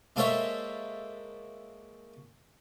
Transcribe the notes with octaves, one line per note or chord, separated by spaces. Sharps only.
G#3 A#3 A4 C5 C#5 E5